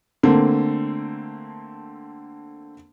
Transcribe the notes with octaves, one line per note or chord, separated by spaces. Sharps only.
D3 A3 A#3 C4